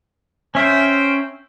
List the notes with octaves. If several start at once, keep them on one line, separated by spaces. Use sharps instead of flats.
C#4 A#4 C5 E5 G5